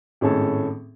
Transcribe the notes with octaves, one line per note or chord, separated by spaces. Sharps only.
G#1 A2 C#4 G#4 A4